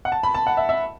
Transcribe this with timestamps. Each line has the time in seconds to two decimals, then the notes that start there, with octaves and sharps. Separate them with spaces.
0.05 F#5
0.12 A5
0.23 B5
0.34 A5
0.47 F#5
0.57 E5
0.69 E5